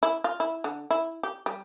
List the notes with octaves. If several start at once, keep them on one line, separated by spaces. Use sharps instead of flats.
E4
F4
E4
D3
E4
G4
G3